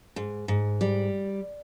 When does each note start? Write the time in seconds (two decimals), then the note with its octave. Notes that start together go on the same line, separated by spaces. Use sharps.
0.16 G#2
0.48 G#2
0.81 G3